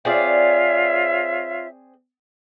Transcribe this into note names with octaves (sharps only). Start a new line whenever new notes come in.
C4 F4 G#4 C#5 D5 E5